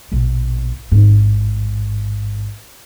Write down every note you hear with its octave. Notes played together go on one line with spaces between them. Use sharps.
A#1 B2
A1 G#2